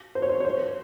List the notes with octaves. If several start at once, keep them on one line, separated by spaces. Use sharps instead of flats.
C5
C#5
C5
C#5
C5